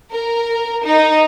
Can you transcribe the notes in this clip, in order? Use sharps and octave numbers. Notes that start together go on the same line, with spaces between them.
A#4
D#4